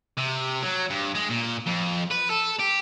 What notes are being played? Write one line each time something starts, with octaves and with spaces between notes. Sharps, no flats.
C3
F#3
G2
G#3
A#2
F2
B4
A4
G4